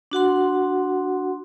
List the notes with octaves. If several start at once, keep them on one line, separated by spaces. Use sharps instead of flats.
D4 F#4 F#5 C6